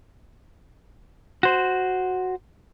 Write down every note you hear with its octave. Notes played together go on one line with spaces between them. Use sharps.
F#4 C5